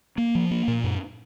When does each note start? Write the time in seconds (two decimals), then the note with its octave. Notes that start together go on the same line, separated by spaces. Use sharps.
0.18 A#3
0.35 F3
0.51 A#3
0.68 A#2
0.84 F#2